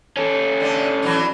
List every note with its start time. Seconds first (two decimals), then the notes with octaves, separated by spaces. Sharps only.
0.17 C#4 A4
0.60 D3 D4
1.02 E3 F#3 D4